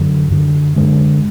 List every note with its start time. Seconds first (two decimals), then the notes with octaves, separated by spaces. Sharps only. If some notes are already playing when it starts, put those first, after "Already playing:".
Already playing: F#2 D3 F#3
0.30 F#2 D3
0.76 F#2 D3 G#3